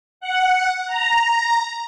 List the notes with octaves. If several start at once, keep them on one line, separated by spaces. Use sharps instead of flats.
F#5
A#5